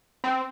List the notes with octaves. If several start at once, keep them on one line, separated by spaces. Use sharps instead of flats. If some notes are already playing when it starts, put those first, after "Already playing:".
C4